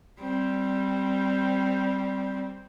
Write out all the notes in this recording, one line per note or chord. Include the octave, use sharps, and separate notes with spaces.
G3 C4